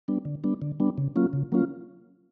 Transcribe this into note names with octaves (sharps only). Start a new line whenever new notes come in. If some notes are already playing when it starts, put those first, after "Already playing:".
G3 B3 D4
D3
G3 B3 D4
D3
G3 B3 D4
C#3
F#3 A#3 C#4 F4
C#3
F#3 A#3 C#4 F4